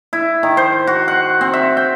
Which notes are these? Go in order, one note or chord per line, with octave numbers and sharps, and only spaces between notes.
E4
D#3
C5
F#4
F#5
C4
E5
G5